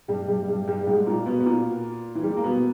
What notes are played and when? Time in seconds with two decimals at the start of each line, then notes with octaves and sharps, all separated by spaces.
0.08 G2 G3
0.28 G2 G3
0.48 G2 G3
0.68 G2 G3
0.83 G3
0.87 G#2 G#3
1.06 A#2 A#3
1.26 B2 B3
1.40 B3
1.46 A#2 A#3
2.15 E3
2.23 G3
2.30 G#3
2.37 A#3
2.44 B2 B3